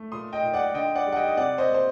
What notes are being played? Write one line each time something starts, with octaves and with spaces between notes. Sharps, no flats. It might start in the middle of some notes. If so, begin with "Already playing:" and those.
Already playing: A3
A#2 C6 D#6
D#5 G5
A#2
D5 F#5
D3 D#5 G5
D5 F#5
G3
F#5
D#5 G5
D#5
C3 D5 F#5
C5 D#5
A#3
C5